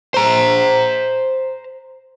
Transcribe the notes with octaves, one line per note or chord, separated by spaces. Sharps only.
C5 A#5